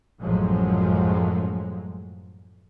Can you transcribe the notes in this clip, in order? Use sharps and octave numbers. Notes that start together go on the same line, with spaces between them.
A1 F#2 A2 F3 F#3 G#3